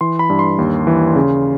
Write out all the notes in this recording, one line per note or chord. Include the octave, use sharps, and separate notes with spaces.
E3 C6
B5
G2
C6
D#2
E3
C#3